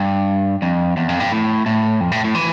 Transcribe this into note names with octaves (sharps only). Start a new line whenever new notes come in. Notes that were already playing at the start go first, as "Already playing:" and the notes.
Already playing: G2
F2
E2
F2
G2
A2
A2
F2
A2
A2
E3